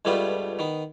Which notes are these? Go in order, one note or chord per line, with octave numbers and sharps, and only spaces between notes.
C#2 G2 G3 A3 B3 F4
D#3 B3